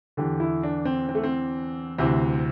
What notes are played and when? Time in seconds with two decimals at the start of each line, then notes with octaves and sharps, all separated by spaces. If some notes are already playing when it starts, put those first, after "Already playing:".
0.17 E2 D3 G4
0.40 E4
0.63 D4
0.85 C4
1.09 C4
1.15 A3
1.23 C4
1.98 D2 C3 E3 C4